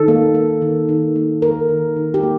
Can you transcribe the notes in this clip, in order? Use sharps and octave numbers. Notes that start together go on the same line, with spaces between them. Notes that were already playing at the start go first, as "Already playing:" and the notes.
Already playing: D#3 A4
A#3
A#3
D#3
D#3
A#3
A#3 A#4
D#3
D#3
G4
A#3